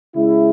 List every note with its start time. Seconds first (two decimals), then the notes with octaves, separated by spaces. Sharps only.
0.15 C#3 G#3 E4